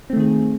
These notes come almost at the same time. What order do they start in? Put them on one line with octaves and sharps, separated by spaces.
C4 A3 D#3 G#4